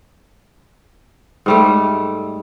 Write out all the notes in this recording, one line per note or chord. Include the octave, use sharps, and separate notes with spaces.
G#2 G3 A3